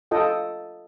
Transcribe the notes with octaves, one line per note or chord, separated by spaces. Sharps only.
F4 A4 D#5 G5